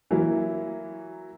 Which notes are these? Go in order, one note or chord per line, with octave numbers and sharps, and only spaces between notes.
E3 F#3 A#3 E4